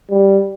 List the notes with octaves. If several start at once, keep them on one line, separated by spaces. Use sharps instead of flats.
G3